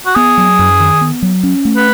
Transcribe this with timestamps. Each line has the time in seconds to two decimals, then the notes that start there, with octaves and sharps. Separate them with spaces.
0.06 F#4
0.16 B3 G#4
0.37 F#3
0.59 F#2
0.80 D#3
1.01 B3
1.22 F#3
1.43 C#4
1.65 A3
1.76 B4